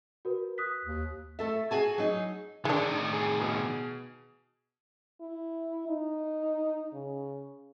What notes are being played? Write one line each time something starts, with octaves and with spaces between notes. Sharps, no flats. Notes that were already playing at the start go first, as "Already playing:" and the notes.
F#4 A#4 B4
D#6 F#6 B6
D#2
A3 A4 E5
F#4 G#4 G#5 A5
F#3 D#4 G#4
D3 D#3 G#3 D4
A2 D#3
G#4
B2 G#4
E4
D#4
C#3